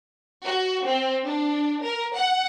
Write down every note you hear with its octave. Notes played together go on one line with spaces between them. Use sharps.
F#4
C4
D4
A#4
F#5